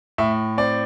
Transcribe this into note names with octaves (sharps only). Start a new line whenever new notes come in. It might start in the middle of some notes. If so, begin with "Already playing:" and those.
A2 E5
C4 D5